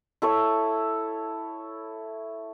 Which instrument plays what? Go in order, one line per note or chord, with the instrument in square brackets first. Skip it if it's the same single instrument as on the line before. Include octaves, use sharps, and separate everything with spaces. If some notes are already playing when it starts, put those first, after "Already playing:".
[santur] E4 A4 C#5